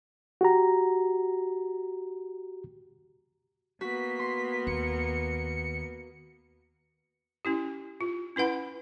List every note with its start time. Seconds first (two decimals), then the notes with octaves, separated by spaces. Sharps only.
0.41 F#4 G4 A#5
3.81 A#3 B3 F#4 B6
4.19 C6
4.67 D#2 C#7
7.45 C#4 E4 G4
8.01 F4
8.36 C#4 E4 B4 F#5 B5